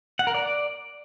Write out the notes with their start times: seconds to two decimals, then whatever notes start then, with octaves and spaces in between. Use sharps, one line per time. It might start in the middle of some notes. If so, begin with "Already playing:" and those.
0.19 F#5
0.27 A#4
0.35 D5